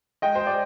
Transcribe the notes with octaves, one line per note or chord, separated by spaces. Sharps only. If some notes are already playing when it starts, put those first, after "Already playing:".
G#3 D#5 G5
C5
G#3 D5